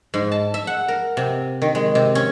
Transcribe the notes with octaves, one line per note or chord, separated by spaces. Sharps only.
G#2
A5
E5
F#5
A#4
C3
D#3
G#3
C3
C#4